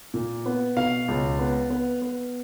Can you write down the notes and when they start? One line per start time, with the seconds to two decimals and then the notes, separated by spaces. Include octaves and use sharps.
0.14 A#2
0.46 B3
0.77 B2 F5
1.08 C#2
1.39 B3
1.70 B3
2.02 B3